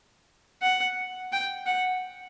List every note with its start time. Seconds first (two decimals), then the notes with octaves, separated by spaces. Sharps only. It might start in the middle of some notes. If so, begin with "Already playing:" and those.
0.62 F#5
1.32 G5
1.66 F#5